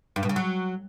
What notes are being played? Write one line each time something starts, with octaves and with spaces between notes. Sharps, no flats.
G2
B2
C#3
F#3